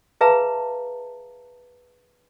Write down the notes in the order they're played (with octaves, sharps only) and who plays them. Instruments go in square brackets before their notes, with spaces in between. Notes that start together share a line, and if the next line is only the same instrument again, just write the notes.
[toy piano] G#4 B4 E5 F5 A5 A#5